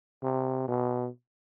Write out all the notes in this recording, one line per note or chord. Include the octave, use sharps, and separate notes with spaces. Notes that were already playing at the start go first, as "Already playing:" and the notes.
C3
B2